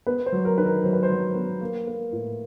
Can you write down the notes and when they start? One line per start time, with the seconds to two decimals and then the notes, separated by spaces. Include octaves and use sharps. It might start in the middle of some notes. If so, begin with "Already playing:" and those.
0.06 B3 B4
0.26 C5
0.32 F#3
0.45 A#4
0.58 D#3 B4
0.65 A#4
0.84 F#3 C5
0.93 B4
1.03 C5
1.10 F#3
1.35 B3
1.61 A#3
1.87 A#3
2.12 A2